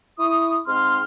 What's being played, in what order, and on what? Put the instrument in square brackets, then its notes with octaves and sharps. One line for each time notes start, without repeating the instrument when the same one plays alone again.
[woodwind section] E4 C#6 D#6
G#2 C4 C6 F6